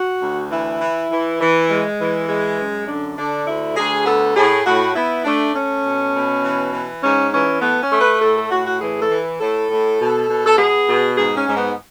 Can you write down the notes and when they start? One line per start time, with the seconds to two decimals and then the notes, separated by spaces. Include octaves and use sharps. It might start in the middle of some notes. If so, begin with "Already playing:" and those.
Already playing: F#4
0.21 D2
0.51 E3 E4
0.80 E3
1.10 E3
1.40 E3
1.69 G#3
2.00 E3
2.28 G#3
2.59 F#2
2.88 D3 D4
3.17 D3 D4
3.47 D2 E4
3.77 D2 G#4
4.06 B3 A4
4.36 A2 G#4
4.65 A2 F#4
4.95 B3 E4
5.25 A3 D4
5.54 A3 C#4
5.84 B2
6.14 B2
6.43 E3
6.73 E3
7.02 G#2 C#4
7.32 E3 C#4
7.62 A3 B3
7.82 C#4
7.91 A3
8.01 B4
8.21 A2 A4
8.36 A4
8.51 A2 F#4
8.65 F#4
8.80 E3 G#4
9.00 A4
9.10 E3
9.39 A2 A4
9.69 A2
9.99 B2
10.28 B2
10.46 A4
10.57 B3 G#4
10.87 B2
11.17 G#2 G#4
11.36 C#4
11.47 G#2
11.57 B3